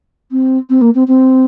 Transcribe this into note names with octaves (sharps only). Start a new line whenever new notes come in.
C4
C4
A#3
C4
C4